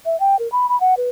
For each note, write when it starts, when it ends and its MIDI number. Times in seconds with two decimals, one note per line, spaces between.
0.06 0.19 76
0.20 0.38 79
0.39 0.50 70
0.52 0.66 83
0.69 0.78 83
0.80 0.94 78
0.97 1.10 71